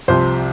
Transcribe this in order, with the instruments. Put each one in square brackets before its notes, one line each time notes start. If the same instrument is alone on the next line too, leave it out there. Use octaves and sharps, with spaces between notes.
[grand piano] C2 C3 F3 C5